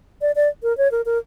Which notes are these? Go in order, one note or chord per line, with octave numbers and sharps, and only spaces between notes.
D5
D5
A#4
C#5
A#4
A#4